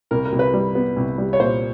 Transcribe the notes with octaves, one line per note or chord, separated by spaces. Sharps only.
C2 A#4
A#4
C2
B4
G3
B3
C2
G3
C#5
A#2 C5